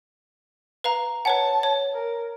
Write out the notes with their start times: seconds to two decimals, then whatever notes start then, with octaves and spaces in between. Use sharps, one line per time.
0.84 B4 F5 A#5
1.25 B4 C#5 F#5 A5
1.63 C#5
1.93 A#4